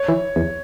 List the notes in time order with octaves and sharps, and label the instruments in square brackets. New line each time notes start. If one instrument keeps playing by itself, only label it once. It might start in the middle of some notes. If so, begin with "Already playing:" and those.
Already playing: [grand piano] C#5
[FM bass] E3
E2